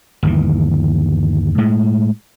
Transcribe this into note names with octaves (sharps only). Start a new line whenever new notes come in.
G1 D#2 E3
A2 G#3